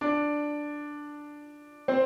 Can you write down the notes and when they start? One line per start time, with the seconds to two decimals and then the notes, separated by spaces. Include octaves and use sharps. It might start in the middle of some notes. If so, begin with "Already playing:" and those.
0.01 D4 D5
1.88 C4 C5